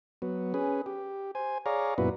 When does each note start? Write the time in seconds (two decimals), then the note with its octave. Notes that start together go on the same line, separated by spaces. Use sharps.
0.22 F#3 B3
0.54 C#4 G#4 B4
0.86 G4
1.35 C5 G#5
1.66 G#4 C#5 D5 F5 A#5
1.98 F#2 A#2 B3 E4 F#4 B4